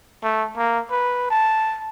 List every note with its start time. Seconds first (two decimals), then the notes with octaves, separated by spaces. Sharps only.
0.23 A3
0.57 A#3
0.91 B4
1.30 A5